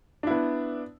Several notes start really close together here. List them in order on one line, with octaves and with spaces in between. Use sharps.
D4 E4 B3